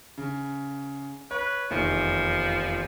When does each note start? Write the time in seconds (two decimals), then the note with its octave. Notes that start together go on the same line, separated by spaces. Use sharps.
0.18 C#3
1.31 B4 C#5
1.71 F1 E2 D#3 F3